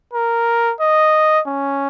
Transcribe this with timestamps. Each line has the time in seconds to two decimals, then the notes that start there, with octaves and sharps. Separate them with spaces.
0.13 A#4
0.80 D#5
1.47 C#4